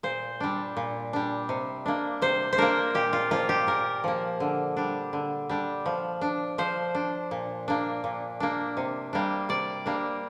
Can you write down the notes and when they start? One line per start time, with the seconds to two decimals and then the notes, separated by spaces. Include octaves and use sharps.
0.03 A#2 C5
0.40 G3 D4
0.77 A#2
1.13 G3 D4
1.49 C3
1.86 A#3 D4
2.22 C3 C5
2.53 C5
2.58 A#3 D4 A#4
2.94 A#2 G4
3.13 F4
3.31 F3 A#3 F4
3.49 G4
3.67 A#2 A#4
4.04 F3 A#3
4.40 D3
4.77 G3 D4
5.13 D3
5.49 G3 D4
5.86 F3
6.21 D4
6.58 F3 C5
6.95 D4
7.31 A#2
7.68 A#3 D4
8.04 A#2
8.40 A#3 D4
8.77 C3
9.13 G3 A#3 D4
9.49 C3 D5
9.86 G3 A#3 D4